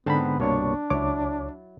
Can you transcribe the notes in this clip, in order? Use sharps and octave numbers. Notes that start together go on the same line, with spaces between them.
G#2 D3 B3 C4 A5 B5
C2 G2 B2 A#3 D4 C#5 C#6
C#2 F#3 E4 C#5 D6